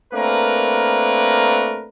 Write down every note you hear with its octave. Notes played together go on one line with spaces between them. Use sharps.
A3 A#3 C4 D4 A#4 B4